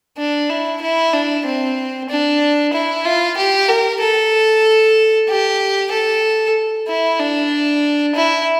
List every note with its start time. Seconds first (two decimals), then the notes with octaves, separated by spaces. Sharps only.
0.18 D4
0.50 E4
0.81 E4
1.13 D4
1.46 C4
2.09 D4
2.73 E4
3.05 F4
3.37 G4
3.68 A#4
4.01 A4
5.28 G4
5.92 A4
6.88 E4
7.20 D4
8.16 E4